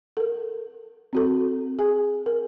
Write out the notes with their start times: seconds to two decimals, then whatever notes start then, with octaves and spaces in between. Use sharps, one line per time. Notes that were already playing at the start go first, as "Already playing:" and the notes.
0.17 A4 A#4
1.13 C4 F#4 A4
1.79 G#4 G#5
2.26 A#4